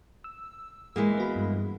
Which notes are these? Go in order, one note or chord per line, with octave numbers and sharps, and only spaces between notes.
E6
E3 G#3 A#3
B3 F#4 B5
G2